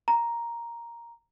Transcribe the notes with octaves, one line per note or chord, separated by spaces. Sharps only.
A#5